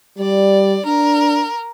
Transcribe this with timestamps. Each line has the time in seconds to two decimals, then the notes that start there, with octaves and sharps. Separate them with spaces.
0.18 G3 D5
0.85 D4 A#4